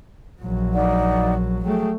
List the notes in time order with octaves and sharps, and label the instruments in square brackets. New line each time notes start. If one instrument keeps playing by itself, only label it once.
[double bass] A#1 F#3
[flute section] D#4 D5 F#5
[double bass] F#3 A3 [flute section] G#4 G5